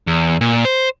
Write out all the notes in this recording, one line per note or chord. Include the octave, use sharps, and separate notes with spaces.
E2
A#2
C5